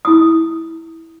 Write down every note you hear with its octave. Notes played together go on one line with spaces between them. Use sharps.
E4 D#6